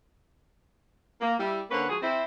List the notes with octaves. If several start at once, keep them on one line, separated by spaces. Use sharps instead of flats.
A#3
G3 E4 E5
D3 A#3 C#4 B4 C5 F#5
F3 G#3 F#4 G#4
C4 E4 C5